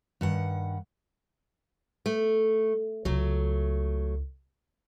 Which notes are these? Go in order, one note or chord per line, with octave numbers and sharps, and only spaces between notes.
G2 D#3 F#5
A3
C#2 C#3 F#3 A3